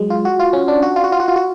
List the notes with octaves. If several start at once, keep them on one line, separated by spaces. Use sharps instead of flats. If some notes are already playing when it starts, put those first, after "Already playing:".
Already playing: F#3 G#3
F4
F#4
F4
C#4
D4
F#4
F4
F#4
F4
F#4
F4
F#4